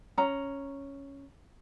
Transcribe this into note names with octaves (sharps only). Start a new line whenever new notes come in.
C#4 A#5